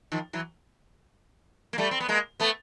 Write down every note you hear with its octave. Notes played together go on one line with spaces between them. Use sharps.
D#3 F3
E3 F#3
A#3
G3 A3
C4
B3
G#3 A#3
A3 B3